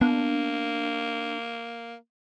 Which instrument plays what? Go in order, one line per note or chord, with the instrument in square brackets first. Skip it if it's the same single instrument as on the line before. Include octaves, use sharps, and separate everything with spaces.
[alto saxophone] A#3 [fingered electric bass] B3 [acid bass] D4